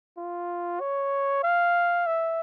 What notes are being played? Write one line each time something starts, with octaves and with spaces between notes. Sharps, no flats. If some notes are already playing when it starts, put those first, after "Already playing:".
F4
C#5
F5
E5